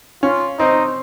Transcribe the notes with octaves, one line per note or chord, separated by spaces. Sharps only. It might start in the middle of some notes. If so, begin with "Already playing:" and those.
C#4 F4
C4 D#4